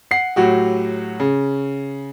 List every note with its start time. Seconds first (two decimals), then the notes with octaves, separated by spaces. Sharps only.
0.11 F#5 C7
0.36 A2 F#3 F#4 G4
1.20 C#3